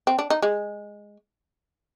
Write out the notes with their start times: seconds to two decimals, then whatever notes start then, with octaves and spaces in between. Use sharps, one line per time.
0.07 C4
0.19 D4
0.30 D#4
0.42 G#3